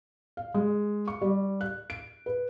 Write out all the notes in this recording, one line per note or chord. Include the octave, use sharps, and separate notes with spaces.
F5
G#3
C#6
G3
F#6
D7
B4